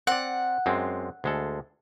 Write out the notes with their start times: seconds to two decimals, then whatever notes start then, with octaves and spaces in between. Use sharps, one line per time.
0.07 C4 D5 F#5
0.66 F#2 G#3 C4
1.24 D2 G#3 A4